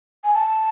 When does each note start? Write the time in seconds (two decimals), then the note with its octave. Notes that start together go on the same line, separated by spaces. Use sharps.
0.24 G#5
0.34 A5